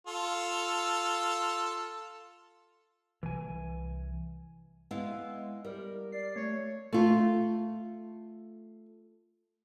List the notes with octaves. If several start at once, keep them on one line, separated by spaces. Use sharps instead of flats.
F4 A4
C2 E3 G#5
G#3 B3 E4 F5
G3 A#4
D5 C7
A3 C#5
A3 F4